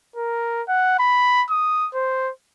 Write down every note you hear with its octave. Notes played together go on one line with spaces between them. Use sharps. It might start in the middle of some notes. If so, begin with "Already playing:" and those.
A#4
F#5
B5
D#6
C5